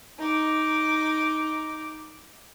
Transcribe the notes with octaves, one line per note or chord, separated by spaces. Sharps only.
D#4 D6